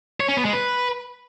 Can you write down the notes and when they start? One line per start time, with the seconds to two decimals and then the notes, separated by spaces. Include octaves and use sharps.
0.20 C#5
0.29 C#4
0.37 B3
0.45 G#3
0.53 B4